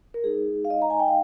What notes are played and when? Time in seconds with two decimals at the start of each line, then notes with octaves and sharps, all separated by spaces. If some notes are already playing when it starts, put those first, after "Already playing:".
0.14 A#4
0.24 G#3 D#4 G#4
0.65 F5
0.70 D#5
0.82 A#5
0.90 G#5
1.00 G5
1.08 F5